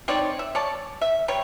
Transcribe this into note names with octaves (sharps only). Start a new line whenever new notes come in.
C4 D#4 C#5 D5
E5
C#5 D5 A5
E5
C3 G3 C#5